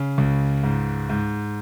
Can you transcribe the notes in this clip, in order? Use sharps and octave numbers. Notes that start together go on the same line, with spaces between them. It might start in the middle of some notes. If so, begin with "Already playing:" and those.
Already playing: C#3
C#2
G#2
G#2